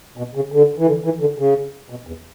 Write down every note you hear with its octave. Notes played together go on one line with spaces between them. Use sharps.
B2
C#3
D3
E3
D3
E3
D3
C#3
B2
E2